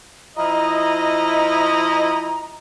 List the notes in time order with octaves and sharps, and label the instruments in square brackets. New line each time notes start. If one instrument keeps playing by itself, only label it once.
[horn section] F3 E4 D#5 [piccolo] A#5